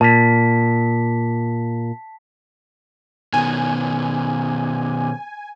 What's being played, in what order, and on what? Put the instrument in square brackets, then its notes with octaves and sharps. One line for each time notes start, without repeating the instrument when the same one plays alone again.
[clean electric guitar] A#2 [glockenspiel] A5 B6
[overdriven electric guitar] B2 D#3 [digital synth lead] G#5